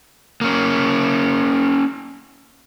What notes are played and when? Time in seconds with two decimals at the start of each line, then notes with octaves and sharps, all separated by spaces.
0.41 A#3 C#4